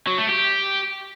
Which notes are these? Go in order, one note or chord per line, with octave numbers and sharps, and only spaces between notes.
F#3
A3
G4